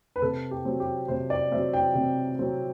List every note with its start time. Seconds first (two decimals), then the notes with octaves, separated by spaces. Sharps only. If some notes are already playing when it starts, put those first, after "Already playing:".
0.16 B4
0.22 C3 A4
0.51 G4
0.65 F#3 C4
0.80 G4
1.08 C3 C5
1.30 D5
1.51 F#3 C4 E5
1.73 G5
1.95 C3
2.39 F#3 C4